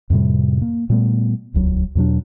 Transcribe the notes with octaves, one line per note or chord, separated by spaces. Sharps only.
F2 A2 C3 G3
A#3
A#2 G3 A3 B3
D#1 C#2 F#3
E2 B2 F#3 D4